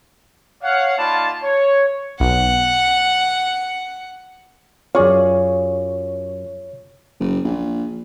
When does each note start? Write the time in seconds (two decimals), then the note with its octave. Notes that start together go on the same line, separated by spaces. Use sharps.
0.62 C#5 F5 F#5
0.97 A#3 D#4 F4 D5 A5 B5
1.43 C#5
2.20 B1 F#5
4.95 F#2 F4 G#4 C#5 D5 F5 C#6
7.20 F#1
7.45 A#1